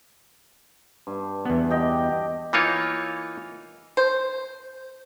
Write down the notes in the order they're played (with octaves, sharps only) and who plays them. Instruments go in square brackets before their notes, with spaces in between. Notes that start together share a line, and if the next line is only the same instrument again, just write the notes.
[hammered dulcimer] G2
[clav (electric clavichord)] E2 B3
[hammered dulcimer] G4 D#5
[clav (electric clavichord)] E3 A#3 D#4 F4 C#5
[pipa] C5